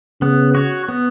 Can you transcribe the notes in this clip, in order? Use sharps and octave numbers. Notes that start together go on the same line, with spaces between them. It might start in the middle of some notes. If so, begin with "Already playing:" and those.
C#3 B3
F#4 C#5
B3